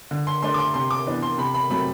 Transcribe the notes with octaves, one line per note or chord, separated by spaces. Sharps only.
D3
C6
A3 D4 C6
D6
C6
C3 C6
D6
E3 B3 D4
C6
C3 B5
B5
F#3 A3 C4 B5